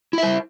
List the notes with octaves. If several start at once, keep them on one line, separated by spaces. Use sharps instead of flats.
E4 C5 E5